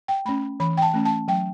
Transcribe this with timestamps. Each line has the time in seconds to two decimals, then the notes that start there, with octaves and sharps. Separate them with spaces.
0.08 G5
0.25 A3 C#4 B5
0.60 E3 B5
0.77 G5
0.82 A5
0.94 A3 C#4
1.05 A5
1.28 F#3 G5